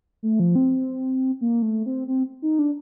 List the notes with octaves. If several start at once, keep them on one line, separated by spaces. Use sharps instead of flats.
A3
F3
C4
A#3
A3
C4
C4
D#4
D4